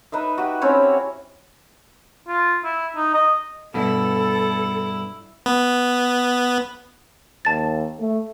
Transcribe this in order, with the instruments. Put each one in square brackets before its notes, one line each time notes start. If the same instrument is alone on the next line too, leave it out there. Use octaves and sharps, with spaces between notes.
[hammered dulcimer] D#4 B4 D#5 E5
F#4 G4
C4 C#4 E4 C#5
[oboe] F4
E4
D#4
D#5
[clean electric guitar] G2 B2 [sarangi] E4 [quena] A4
[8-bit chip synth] B3
[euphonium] D#2 [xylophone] A5 A6
[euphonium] A3